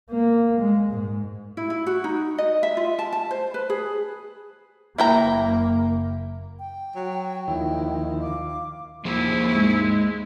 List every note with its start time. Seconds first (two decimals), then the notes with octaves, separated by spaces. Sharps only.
0.10 A#3
0.59 G#3
0.91 G#2
1.57 E4
1.70 E4
1.87 F#4
2.04 D#4
2.38 D#5
2.63 E5
2.77 F4
2.99 A5
3.12 A5
3.31 C5
3.54 B4
3.70 G#4
4.98 F#1 A#3 E4 G5 A#5
6.57 G5
6.96 F#3
7.48 D#2 D#3 F3 E4
8.23 F5 D6
9.05 D#2 F3 E4 G#4 C5
9.55 G#2 G#3